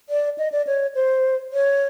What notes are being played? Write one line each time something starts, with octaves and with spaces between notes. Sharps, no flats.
D5
D#5
D5
C#5
C5
C#5